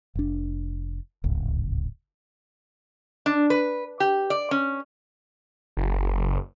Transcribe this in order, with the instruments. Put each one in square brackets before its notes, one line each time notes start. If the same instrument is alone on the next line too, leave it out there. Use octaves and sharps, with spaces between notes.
[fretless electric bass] F1 D4
D1 G#1 C#2
[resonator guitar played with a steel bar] D4
B4
G4
D5
C#4
[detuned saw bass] F#1